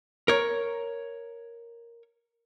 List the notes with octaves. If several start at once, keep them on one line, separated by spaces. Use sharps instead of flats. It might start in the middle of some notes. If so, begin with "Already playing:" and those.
A#4 C#5